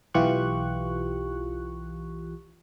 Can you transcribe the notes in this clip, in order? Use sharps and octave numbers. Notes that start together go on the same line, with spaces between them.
B1 E3 F4 G4 C#6 F#6